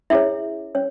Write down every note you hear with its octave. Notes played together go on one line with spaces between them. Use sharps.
C#4 E4 G#4 C#5 E5
C#4 C#5